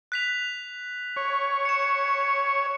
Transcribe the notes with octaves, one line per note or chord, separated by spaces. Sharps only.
F#6 B6 F7
C#5
C#7 E7